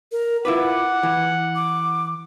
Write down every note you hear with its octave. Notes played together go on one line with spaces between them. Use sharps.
A#4
E4 F4 B4 F#5 D6
E3
D6